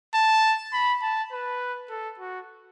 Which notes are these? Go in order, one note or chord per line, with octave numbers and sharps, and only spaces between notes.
A5
B5
A5
B4
A4
F#4